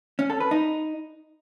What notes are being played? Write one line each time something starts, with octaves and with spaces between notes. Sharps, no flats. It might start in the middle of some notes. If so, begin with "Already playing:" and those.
C#4
A4
B4
D#4